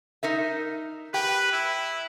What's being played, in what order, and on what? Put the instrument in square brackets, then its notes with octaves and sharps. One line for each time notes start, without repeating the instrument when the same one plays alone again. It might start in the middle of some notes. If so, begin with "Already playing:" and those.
[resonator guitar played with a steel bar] D#4 A#4 E5
[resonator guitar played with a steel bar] G4 G5 [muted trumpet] B4
[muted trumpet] E4